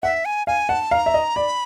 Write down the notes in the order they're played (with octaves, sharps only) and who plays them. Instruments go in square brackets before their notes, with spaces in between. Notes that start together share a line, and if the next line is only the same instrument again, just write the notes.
[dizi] E5 [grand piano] F#5
[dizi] G#5
[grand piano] F5 [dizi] G#5
[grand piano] F#5 [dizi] A5
[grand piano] F5 [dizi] A#5
[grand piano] E5
D#5
[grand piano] D5 [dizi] B5